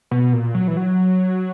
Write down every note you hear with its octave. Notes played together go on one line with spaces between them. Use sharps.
B2
A#2
F#3
E3
F#3